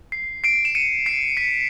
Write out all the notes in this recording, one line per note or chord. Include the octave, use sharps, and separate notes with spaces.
C7
C7 D7
E7
C#7 D#7
C7 D7
B6 C#7